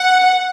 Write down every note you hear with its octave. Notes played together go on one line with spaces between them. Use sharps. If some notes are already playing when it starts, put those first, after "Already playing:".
Already playing: F#5